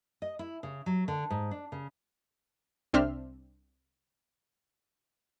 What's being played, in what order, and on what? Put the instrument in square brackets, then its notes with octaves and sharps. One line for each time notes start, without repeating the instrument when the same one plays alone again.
[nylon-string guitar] D#5
E4
C#3
F#3
D3
G#2
D4
C#3
[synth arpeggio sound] C2 C4 D4 E5 C6 F6